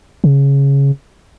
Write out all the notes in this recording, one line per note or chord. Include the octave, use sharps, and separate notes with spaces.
C#3